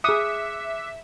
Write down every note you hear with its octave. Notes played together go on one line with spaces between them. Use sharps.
G#4 E5 D6 D#6 F#6 C#7